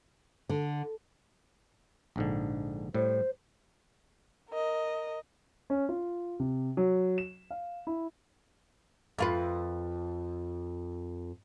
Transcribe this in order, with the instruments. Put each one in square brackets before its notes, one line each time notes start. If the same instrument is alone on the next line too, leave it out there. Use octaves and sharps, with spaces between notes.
[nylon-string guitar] D3
[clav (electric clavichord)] A#1 G#2 D3
[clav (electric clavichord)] A2 G3 [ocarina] C5
[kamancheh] A#4 D#5
[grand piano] C#4
F4
C3
F#3
E7
F5
E4
[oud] F2 F4 B4